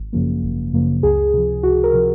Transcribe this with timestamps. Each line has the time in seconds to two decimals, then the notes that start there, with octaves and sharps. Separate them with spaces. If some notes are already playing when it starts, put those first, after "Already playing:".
Already playing: G#1
0.13 F#2 C#3 F3 A#3
0.43 G#1
0.73 F#2 C#3 F3 A#3
1.03 C#2 G#4
1.34 C3 F3
1.63 C#2 F#4
1.84 A#4
1.94 C3 F3